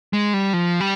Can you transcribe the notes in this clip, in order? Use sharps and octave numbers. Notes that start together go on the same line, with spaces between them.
G#3
G3
F3
G3